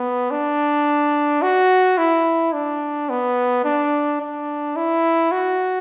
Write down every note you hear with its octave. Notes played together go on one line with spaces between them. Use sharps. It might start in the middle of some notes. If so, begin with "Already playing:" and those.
Already playing: B3
D4
F#4
E4
D4
B3
D4
D4
E4
F#4